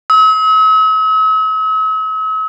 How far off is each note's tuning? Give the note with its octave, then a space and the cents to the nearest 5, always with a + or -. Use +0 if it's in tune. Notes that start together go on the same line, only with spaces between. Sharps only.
E6 -45